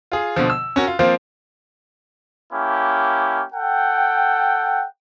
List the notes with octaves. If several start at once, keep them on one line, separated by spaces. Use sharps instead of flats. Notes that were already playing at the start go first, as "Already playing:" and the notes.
F4 G#4
B2 D3 F3
E6
C#4 F#4 A#4
F4
F3 A#3 C4 F4
A#3 C#4 E4 G4
A4 F#5 G5